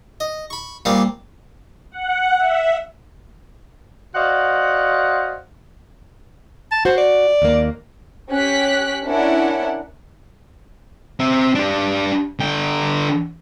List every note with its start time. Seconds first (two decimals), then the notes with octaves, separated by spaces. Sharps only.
0.20 D#5
0.50 B5 C#6
0.85 A#2 G3 C4 F5 D#6
1.91 F#5
2.38 E5
4.15 F#4 C5 D5 D#5 F5 F#5
6.71 A5
6.85 F#4 C5
6.97 D5
7.42 D#2 A#3
8.30 C#4 G4 F#6 B6
9.05 C#4 D4 E4 A#4 F#5
11.20 C4 E5
11.55 D4 G4
12.40 D3 G5